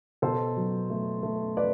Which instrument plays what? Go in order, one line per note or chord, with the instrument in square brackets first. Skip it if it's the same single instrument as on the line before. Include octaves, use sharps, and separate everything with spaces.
[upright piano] B2 A4 C5
F#3
A3
A3
B4 D5